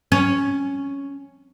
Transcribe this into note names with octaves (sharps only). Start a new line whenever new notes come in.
C#4